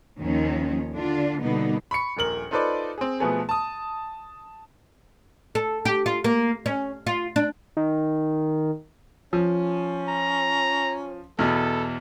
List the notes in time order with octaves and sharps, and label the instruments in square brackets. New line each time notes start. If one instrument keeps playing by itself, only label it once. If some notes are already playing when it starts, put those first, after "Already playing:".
[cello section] D#2 D#3 F3 C#4
D3 D4 F4
B2 D3 G3 A#3 B3 D#4
[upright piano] B5 C#6 C#7
D#1 A#1 A#4 F#7
D#4 F4 A4 B4 C5 D5
C4 G#4
B2 F3 A3 B3 G#4
A5 D#6
[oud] A4
G4
F4
A#3
C#4
F4
D4
[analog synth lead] D#3
[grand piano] F3 [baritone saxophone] C#4
[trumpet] A#5
[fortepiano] E2 B2 [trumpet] A4